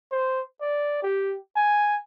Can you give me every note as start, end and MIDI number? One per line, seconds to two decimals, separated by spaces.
0.12 0.41 72
0.61 1.00 74
1.03 1.37 67
1.56 1.97 80